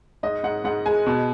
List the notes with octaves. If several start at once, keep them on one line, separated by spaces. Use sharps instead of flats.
G#2 D#5
G#2 F#5
G#2 F#5
G#3 G#5
B2